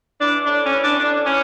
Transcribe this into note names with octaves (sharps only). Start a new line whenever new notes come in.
E3 D4
A2 D4
C#4
E3
D4
A2 D4
E3 C#4